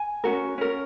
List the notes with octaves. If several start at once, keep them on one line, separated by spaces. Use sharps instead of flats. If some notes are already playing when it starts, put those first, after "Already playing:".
Already playing: G#5
C#4 F#4 A#4
C#4 A#4